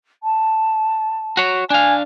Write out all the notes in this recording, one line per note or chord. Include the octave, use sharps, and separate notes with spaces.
A5
F#4 C#5
D4 F5 G#5